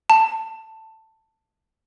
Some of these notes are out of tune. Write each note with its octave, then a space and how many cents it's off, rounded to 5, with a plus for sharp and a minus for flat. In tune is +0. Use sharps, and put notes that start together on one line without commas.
A5 +10